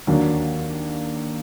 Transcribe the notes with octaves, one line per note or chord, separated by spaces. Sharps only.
D#2 D3 F#3 A#3 D4